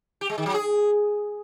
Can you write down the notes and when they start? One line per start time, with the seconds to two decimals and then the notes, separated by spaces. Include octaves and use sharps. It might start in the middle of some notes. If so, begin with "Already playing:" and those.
0.21 G4
0.29 G#3
0.38 D#3
0.46 F#3
0.54 G#4